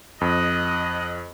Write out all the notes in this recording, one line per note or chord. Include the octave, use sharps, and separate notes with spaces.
F2 D#5 F#6